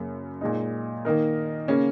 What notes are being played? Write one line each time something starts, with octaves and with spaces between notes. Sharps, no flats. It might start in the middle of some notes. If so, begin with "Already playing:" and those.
Already playing: F#2 C#3 A#3
A#2 G#3 D#4
D#3 A#3 D#4 A#4
C#3 A#3 C#4